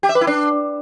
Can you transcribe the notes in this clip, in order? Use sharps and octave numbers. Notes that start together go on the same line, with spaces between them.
G4
E5
B4
E4
D4